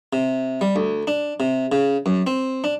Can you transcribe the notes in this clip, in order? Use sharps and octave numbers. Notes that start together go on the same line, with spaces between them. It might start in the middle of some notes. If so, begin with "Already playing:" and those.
C3
G3
D2
D4
C3
C#3
F#2
C4
D4